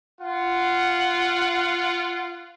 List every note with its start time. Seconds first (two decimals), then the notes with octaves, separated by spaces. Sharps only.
0.21 F4 F#5